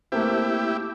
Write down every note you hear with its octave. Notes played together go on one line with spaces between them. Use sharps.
A3 A#3 C4 E4 G4